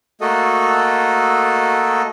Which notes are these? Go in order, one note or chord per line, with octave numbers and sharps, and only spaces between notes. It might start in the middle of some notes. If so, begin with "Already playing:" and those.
A3 A#3 F#4 A4 D#5